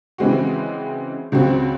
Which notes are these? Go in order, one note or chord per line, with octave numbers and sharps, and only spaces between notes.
C#3 E3 G#3 C4 F#4
C#2 C#3 F#3 C4 F#4